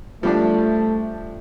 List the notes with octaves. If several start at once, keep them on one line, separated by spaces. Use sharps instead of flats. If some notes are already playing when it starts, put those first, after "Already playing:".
F3 G3 A3 D4